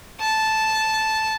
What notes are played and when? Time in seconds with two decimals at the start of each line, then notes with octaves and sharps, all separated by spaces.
0.20 A5